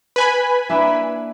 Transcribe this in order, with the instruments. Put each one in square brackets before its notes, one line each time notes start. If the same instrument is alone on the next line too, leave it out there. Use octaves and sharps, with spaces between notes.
[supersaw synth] B4 G#5 B5
[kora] A#3 D4 E4